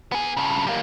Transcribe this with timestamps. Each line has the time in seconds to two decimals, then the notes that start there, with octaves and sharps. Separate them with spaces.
0.12 B3 G#4
0.37 G2 C#3
0.67 G3 A#3